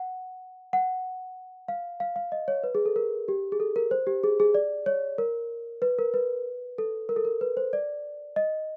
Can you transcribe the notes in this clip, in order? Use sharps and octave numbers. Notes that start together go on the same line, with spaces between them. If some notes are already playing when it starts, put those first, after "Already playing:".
Already playing: F#5
F#5
F5
F5
F5
D#5
C#5
B4
G#4
A4
A#4
G4
G#4
A4
A#4
C5
G4
G#4
G#4
D5
C#5
A#4
B4
A#4
B4
A4
A#4
A4
A#4
B4
C5
D5
D#5